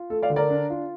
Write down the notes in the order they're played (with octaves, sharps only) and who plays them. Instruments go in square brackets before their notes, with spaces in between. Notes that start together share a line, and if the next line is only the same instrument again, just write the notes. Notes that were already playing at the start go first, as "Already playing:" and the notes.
Already playing: [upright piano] F4
A3 A4
D5 F5
D3
A#4 D5
D4
F4